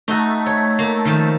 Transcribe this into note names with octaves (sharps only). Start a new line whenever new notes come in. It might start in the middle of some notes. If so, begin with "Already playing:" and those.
A3 D#4 F#4
C#5
A#3
D#3 F3